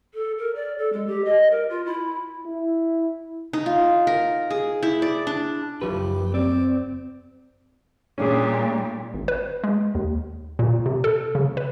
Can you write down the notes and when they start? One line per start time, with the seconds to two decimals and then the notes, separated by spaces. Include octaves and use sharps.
0.14 A4
0.38 A#4
0.55 D5
0.78 A4
0.93 G#3
1.07 G4
1.24 D#5
1.50 A#4
1.69 F4
1.85 E4
2.46 E4
3.53 D#4
3.66 F4
4.07 A#4
4.51 G#4
4.83 E4
5.02 D5
5.27 D4
5.82 F#1 F3 G4 B4
6.34 C4 D5
8.18 A#2 G3 C#4 D4 G#4
9.14 G#1
9.28 B4
9.64 G#3
9.95 D#2
10.59 A#2
10.86 C3
11.04 A4
11.35 C#3
11.57 B4